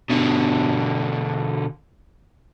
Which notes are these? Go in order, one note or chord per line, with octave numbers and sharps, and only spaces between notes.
B2 D3